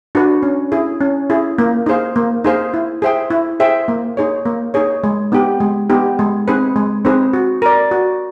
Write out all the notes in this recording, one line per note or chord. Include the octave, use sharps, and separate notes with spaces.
D4 F#4 B4
C#4
E4 G#4
C#4
E4 G#4
A#3
D#4 G#4 C5 F5
A#3
D#4 G#4 C5 F5
E4
G#4 C5 E5 G5
E4
G#4 C5 E5 G5
A#3
D#4 G#4 C#5
A#3
D#4 G#4 C#5
G#3
B3 D#4 G4
G#3
B3 D#4 G4
G#3
C4 D#4 G#4 B4
G#3
C4 D#4 G#4 B4
F#4
A#4 D5
F#4